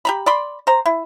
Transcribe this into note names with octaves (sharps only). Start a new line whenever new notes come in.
G4 A#5 B5
D5 B5 C6
C5 A#5
E4